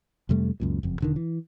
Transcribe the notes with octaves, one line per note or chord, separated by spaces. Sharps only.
F2 C3 G3 A3
C#2 F#2 A#2
F#1 F2
E1 D3 D#3
E3